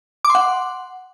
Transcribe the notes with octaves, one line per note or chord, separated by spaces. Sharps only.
D6
C6
F#5